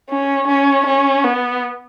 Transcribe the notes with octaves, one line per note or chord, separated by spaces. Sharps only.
C#4
C#4
C#4
B3